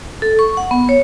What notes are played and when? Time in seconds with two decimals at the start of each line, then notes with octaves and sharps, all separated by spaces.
0.22 A4
0.39 C#6
0.57 F#5
0.71 B3
0.89 C#5